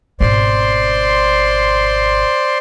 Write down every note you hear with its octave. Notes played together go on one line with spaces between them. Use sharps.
G#1 B2 C5 D5 C6